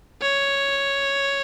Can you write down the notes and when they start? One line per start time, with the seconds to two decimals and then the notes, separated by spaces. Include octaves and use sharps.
0.22 C#5